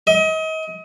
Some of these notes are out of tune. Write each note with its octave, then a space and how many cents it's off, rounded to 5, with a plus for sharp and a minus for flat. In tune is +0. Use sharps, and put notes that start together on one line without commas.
D#5 +35